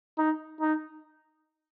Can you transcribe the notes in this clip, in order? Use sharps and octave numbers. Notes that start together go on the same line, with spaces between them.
D#4
D#4